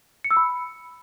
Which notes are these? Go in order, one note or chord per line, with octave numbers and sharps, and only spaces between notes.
C#7
E6
B5